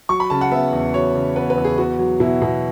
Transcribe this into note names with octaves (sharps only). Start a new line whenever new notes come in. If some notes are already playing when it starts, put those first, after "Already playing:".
F#3 C#6
B5
C#3 A5
F#5
B3 E5
E2
F#3 C#5
C#3
B3 B4
B4
E2
G#4
B3 F#4
F#3
B2 E4
B2